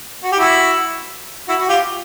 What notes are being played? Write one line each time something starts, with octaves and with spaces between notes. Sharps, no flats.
F#4
G4
E4 F#4
E4 F#4
F#4
F4 G4